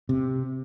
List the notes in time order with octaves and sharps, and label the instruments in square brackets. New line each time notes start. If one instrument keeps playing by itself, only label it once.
[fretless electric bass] C3